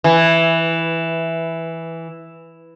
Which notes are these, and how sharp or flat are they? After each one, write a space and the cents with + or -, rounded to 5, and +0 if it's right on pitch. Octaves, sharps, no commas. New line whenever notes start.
E3 +0